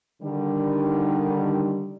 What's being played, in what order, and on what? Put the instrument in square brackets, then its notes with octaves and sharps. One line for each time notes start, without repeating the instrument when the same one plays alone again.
[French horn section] D3 D#3 G3